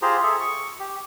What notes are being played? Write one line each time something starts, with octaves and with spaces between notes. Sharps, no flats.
F4 G4 G#4 C5 A#5
G#4 A4 E5
C#6
G4